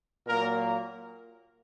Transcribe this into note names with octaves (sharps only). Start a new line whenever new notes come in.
A#2 F#3 A#3 A#4